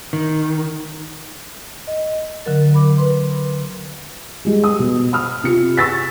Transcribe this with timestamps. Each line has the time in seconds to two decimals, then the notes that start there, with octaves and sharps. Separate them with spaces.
0.13 D#3
1.87 D#5
2.45 D3 F#3 A#4 A6
2.72 D3 A#4 B5 D6
2.97 B4 C6
4.45 G3 G#3
4.64 D#6
4.79 B2
5.13 B5 D#6 F6
5.44 C3 F4 C#7
5.77 C#6 E6 A6 B6